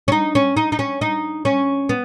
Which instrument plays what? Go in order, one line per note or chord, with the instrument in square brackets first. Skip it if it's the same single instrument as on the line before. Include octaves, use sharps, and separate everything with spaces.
[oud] C#4
D#4
C#4
D#4
D#4
C#4
D#4
C#4
B3